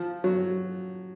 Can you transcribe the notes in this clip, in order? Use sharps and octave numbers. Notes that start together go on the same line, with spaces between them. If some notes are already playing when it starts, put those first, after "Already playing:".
Already playing: F3
F#3